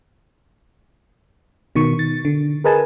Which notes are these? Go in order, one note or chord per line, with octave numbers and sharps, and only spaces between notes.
B2 D#3 C#6
A6
D3
G#4 A#4 B4 D#5 G#5 A5